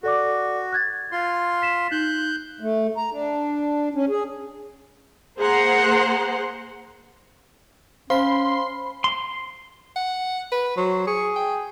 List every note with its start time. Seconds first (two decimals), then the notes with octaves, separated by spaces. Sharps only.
0.03 F#4 A4 D5 D6
0.73 F#6 G#6 A6
1.12 F4 C6
1.62 B6 E7
1.92 D#4 F#6 G6
2.61 A3
2.97 A#5
3.12 D4
3.95 C#4
4.09 G#4
5.38 A#3 G#4 C5 F#5 A#5 C6
8.10 C#4 C5 F5 B5 C6
9.04 C6
9.96 F#5
10.52 B4
10.77 F#3 C5
11.07 G#4 C#6
11.36 G5